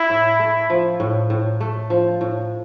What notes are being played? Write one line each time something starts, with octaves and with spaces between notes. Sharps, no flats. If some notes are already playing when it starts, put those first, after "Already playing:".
Already playing: E4
A2
A3
F3
A2
A2
A3
F3
A2